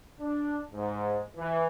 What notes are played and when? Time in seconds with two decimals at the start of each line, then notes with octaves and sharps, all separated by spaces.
0.20 D4
0.73 G#2
1.37 E3